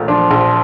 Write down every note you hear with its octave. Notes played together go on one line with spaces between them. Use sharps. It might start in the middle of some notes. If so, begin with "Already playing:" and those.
Already playing: A#1 A#2 A3
F3 D4
A#1